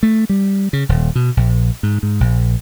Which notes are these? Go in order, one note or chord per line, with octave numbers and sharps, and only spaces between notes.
A3
G3
C#3
D#1
B2
A#1
G#2
G#2
A#1